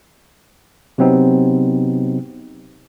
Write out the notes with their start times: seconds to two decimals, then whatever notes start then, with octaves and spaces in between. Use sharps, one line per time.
0.98 C3 F#3 B3 C4 D#4